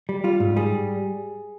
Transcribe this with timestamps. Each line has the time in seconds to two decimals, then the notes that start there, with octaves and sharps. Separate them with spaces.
0.09 G3
0.24 G3 F4
0.40 G#2
0.57 G3 G#4